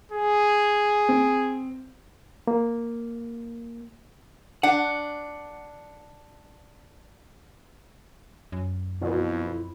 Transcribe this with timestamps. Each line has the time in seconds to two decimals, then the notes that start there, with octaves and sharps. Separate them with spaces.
0.12 G#4
1.09 C4
2.48 A#3
4.63 D4 F#5
8.52 F#2
9.01 F2 B2 E4